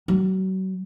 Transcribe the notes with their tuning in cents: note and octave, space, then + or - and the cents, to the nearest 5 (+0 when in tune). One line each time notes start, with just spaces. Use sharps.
F#3 +35